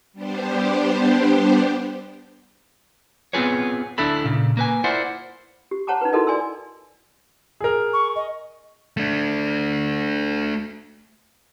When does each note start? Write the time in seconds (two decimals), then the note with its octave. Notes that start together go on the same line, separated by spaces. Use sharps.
0.13 G3 B3 D4 G4 C5
3.33 B3 C4 F4 G#4 B4 C#5
3.98 D2 D3 D4 E4 A4 B5
4.25 A#2 C#3
4.57 A#3 B4 G#5
4.84 E4 F4 A#4 C5 D5 F#5
5.71 G4
5.87 C5 C#5 F#5 A5 A#5 D6
6.02 D#4 B4
6.13 D#4 E4 F#4 A4 A#4 D#5
6.27 D5 G#5 C6 E6
7.61 G#4 A#4
7.93 C#6
8.16 D#5
8.97 A3 D4